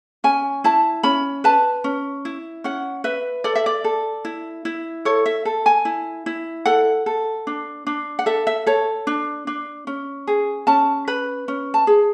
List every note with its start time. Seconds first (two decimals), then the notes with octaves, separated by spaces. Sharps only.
0.24 C#4 G#5
0.64 E4 A5
1.03 C#4 B5
1.44 B4 A5
1.84 C#4
2.25 E4
2.64 C#4 F#5
3.04 B4 E5
3.44 A4 D5
3.55 E5
3.66 D5
3.84 A4
4.25 E4
4.65 E4
5.05 A4 C#5
5.26 E5
5.45 A4
5.66 G#5
5.85 E4
6.26 E4
6.65 A4 F#5
7.06 A4
7.47 D4
7.87 D4
8.19 F#5
8.26 A4 E5
8.47 E5
8.66 A4 C#5
9.07 D4
9.47 D4
9.87 C#4
10.27 G#4
10.67 C#4 A5
11.07 B4 B5
11.48 C#4
11.74 A5
11.87 G#4